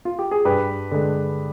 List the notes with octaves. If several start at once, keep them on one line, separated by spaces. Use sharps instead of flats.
F4
G4
G#4
G2 G4 B4
D3 G#3